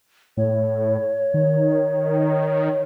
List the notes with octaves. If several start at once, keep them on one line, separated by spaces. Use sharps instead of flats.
A2 C#5
D#3